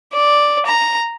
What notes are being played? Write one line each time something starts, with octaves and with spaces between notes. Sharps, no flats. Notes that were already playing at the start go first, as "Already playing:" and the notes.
D5
A#5